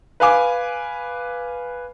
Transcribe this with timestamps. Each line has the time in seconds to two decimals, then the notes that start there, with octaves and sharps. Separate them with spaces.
0.20 B4 F5 G#5 D6